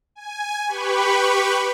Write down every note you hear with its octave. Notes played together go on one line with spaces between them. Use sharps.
G#5
G4 B4 B5 C#6